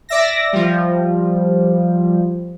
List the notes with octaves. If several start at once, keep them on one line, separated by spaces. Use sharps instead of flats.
D5 E5 A#6
F3 G3